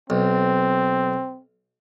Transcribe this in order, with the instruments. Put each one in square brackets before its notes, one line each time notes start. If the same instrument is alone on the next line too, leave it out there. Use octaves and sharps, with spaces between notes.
[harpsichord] B1 [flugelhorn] C4